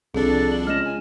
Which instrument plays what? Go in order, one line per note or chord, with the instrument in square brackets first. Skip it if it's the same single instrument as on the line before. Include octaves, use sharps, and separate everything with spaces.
[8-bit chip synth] C2 D4 [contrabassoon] F2 [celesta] G#4 [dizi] A4
[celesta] F#7
[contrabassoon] C#2 [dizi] D#5 [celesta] F6 E7
[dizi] G#5